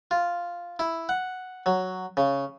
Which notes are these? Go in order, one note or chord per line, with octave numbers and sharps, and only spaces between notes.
F4
E4
F#5
F#3
C#3